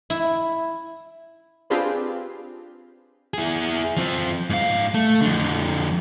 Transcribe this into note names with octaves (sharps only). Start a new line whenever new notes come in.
E4
C4 D4 F4 G4 G#4 B4
E4 G#4
F3 C4
G#2 F5
A3
F2 D3